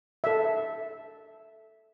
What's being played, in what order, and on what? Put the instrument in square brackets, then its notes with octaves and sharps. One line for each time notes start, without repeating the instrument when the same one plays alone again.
[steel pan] A4 E5